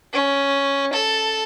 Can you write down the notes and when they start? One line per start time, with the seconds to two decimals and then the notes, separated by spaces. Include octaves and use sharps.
0.13 C#4
0.93 A4